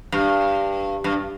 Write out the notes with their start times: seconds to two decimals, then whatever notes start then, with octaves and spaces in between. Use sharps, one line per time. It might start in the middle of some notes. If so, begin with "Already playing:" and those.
0.12 G2
1.04 G2